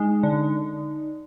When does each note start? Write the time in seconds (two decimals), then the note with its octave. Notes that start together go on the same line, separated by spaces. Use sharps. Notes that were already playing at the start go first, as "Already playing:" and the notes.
Already playing: G#3 D#4
0.23 D3